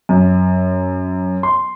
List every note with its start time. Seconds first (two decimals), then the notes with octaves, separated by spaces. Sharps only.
0.09 F#2
1.43 C6